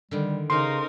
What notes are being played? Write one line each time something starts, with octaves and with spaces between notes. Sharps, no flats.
D3 D#3 G3
C#3 C#4 D#4 A#4 C5 C6